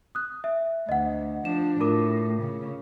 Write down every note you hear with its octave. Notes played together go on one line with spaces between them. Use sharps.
D#6 F#6
E5
D2 D#5 F#5
F3 D4 E7
A2 F4 A#4 D6
C#3